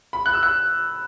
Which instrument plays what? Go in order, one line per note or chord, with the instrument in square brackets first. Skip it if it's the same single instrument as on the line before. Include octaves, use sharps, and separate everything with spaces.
[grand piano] B5
F#6
E6
F#6